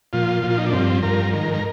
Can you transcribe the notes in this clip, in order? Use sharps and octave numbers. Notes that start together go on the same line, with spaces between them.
A#2 F3 F4
A#2 F3
F4
D#4
D4
G2 F3 C4
G2 F3 A#4
G#2 D#3 A#4
A#4